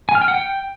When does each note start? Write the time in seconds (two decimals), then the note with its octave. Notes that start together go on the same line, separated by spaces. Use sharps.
0.09 G#5
0.15 F6
0.22 G5
0.28 F#5
0.34 G5